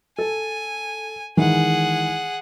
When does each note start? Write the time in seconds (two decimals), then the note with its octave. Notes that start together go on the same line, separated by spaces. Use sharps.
0.19 A4 G#5
1.37 D#3 E3 G#3 G#4 F#5